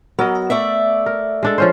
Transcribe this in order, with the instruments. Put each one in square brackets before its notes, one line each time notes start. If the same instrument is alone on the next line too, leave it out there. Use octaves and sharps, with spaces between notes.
[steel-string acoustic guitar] F#3 [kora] B3 A#4 D#5
[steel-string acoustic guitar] A3 D5 E5
[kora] A#4
G#3 D4 A4
F3 C#4 C5